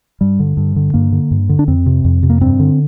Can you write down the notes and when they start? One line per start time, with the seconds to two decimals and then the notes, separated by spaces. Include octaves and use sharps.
0.21 G2 G3
0.39 D3
0.57 G2
0.76 D3
0.94 G2 A#3
1.12 D3
1.31 G2
1.49 D3
1.59 D4
1.68 F2 C4
1.86 C3
2.05 F2
2.23 C3
2.30 A#3
2.41 G2 C4
2.60 D3